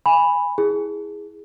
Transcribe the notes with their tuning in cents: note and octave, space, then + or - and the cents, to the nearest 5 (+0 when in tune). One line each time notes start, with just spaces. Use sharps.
G#5 -20 B5 +0
E4 -10 G#4 -5